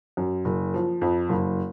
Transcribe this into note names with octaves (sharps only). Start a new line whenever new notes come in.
F#2
F#1
F3
F2
F#1